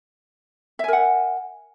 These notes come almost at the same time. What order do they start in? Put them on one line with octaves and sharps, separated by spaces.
E5 G#5 A#4 F#5